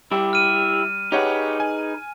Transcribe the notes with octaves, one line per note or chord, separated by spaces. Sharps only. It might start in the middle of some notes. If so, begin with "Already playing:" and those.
G3 E4 G4
F6 D#7
D#4 G4 G#4 B4 C#5 F#5
G#5